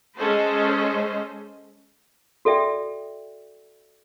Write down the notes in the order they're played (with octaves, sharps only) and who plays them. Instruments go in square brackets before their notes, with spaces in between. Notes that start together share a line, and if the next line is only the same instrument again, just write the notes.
[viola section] G#3 C#4 A4 C5 D#5
[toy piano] F#4 A4 D5 E5 G5